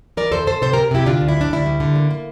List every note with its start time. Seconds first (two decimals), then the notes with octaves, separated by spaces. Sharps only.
0.17 E3 A#4 D5
0.32 E2 A4 C5
0.47 E2 A4 C5
0.62 C3 A4 C5
0.73 C3 G4 A#4
0.91 C3 E4 G4
1.06 D3 D4 F4
1.21 D2
1.28 E4
1.37 G3 D4
1.51 D2 E4
1.66 G3
1.80 D3
1.96 A#3
2.11 A#3